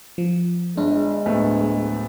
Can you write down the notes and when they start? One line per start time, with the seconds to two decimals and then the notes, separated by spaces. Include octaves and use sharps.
0.18 F3
0.77 G1 G#3 D4
1.26 D1 A3 B3